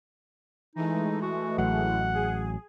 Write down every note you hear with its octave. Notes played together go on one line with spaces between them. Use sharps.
E3 G#3 A3 D#4
F#4
A1 F#3 F#5
G#4